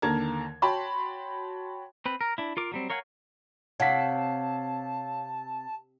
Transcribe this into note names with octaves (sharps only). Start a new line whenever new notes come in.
D#2 D3 A#4 A5 A#5 G#6
F#4 C#5 G5 A5 B5 C6
C4 B4
A#4
D4 E4
F4 A#4 D6
F#3 G3 C4
A#4 C#5 F5 F#5 G#5
C3 C#5 F5 F#5 A5 B6